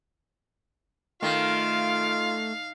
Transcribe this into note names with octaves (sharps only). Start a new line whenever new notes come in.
D#3 A3 F4 F5